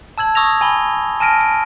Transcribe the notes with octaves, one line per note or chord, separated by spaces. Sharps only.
A5 E6 G#6 F#7
C#6 D#6 E6 G#6 A#6 F7
G#5 B5 G7
G#5 A5 F6 A#6 D7 D#7
D7